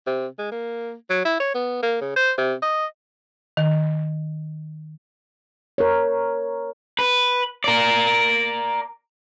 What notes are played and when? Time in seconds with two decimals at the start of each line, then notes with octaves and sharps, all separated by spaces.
0.07 C3
0.39 G#3
0.52 A#3
1.10 F#3
1.25 E4
1.40 C#5
1.55 B3
1.83 A#3
2.01 C#3
2.16 C5
2.38 C3
2.62 D#5
3.57 D#3
5.78 A#4 C#5
6.99 B4
7.64 A#4 D5